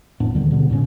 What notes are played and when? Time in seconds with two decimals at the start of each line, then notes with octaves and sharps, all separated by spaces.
0.20 F1 A2 B3 D4
0.34 D#2 D3 D#3 G3
0.51 B2 D3 B3
0.70 E1 A2 C#3 C#4